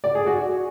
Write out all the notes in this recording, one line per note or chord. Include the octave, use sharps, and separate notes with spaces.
D5
G#4
F#4